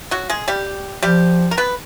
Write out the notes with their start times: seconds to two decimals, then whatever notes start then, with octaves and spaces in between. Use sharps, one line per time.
0.11 F#3 F#4
0.30 G#3 G#4
0.48 G3 G4
1.02 F3 G3 G4
1.51 A#4
1.57 B3 B4